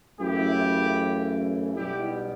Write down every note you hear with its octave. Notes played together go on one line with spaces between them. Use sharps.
F#2 C#3 E3 A3 E4 G4
B1 B2 G3 E4 G4